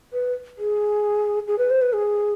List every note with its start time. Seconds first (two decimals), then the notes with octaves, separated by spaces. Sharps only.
0.13 B4
0.58 G#4
1.48 G#4
1.58 B4
1.70 C5
1.82 B4
1.93 G#4